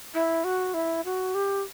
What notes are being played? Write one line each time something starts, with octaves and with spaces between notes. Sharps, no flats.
E4
F#4
E4
F#4
G4